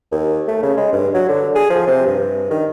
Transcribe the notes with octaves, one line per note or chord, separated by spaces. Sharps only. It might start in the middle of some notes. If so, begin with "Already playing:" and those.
D#2
A3
C#3
G#3
G2
F#3
D3
G#4
F3
C3
G2
D#3